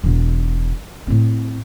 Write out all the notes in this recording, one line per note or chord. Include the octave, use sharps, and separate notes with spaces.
E1 B2
A2 C4